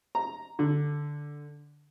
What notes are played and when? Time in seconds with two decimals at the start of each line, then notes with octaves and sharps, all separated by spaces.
0.15 A#5
0.59 D3